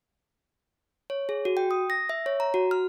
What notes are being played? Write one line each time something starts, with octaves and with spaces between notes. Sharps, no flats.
C#5
G#4
F#4
G5
D#6
A#6
E5
C#5
A#5
F#4
F6